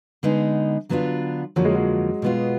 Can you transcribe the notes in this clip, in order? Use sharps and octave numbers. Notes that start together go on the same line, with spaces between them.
D3 G#3 B3 D#4
D3 F#3 B3 D4 F4
F2 D3 F3 F#3 A#3
G#3
F#3
B2 G#3 B3 F4